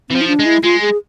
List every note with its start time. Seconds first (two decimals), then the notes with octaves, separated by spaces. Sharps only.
0.10 E3 C4
0.15 F3
0.21 E4
0.27 D4
0.39 G#3
0.45 E4
0.63 G#3 F4
0.81 G#4